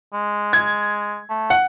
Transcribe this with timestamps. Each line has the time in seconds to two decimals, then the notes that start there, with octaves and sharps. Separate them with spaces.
0.14 G#3
0.53 G#6
1.30 A3
1.50 F#5